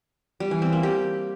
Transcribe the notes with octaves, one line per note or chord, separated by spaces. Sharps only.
G3
E3
C4
A#3
G4